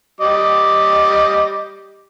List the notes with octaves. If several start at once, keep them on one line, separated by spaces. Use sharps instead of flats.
G3 D#5 D6